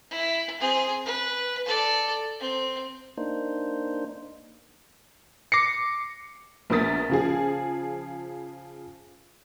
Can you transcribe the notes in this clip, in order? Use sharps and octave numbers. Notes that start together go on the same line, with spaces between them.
E4
C4 G#4
B4
A4 D5
C4
A#3 D4 D#4 C5
D6 A#6 C7 C#7
A#1 B3 A#4 D#6 A6 B6
C#3 F3 G#4